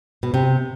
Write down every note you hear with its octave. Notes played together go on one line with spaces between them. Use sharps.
B2
C3